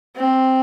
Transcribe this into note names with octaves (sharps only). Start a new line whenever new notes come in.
C4